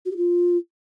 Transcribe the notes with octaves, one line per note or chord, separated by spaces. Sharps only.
F#4
G4
F4